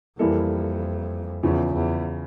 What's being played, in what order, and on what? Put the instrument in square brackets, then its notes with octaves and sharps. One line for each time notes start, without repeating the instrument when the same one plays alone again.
[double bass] F2 [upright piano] E3 G3 A#3 E4 A4
[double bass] E2 [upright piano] C#3 F3 C#4
[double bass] E2